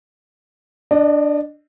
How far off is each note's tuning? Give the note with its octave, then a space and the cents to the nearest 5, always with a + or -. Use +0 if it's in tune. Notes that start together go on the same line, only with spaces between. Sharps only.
D4 +0 D#5 -35